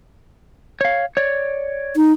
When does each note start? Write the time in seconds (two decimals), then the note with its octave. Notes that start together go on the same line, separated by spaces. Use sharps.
0.81 C#5 F5
1.17 C#5 D5
1.96 D#4